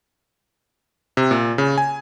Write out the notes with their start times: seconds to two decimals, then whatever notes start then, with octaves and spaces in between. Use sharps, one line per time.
1.17 C3
1.31 A#2
1.58 C#3
1.78 G#5